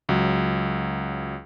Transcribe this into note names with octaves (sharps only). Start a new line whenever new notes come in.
C#2 F#3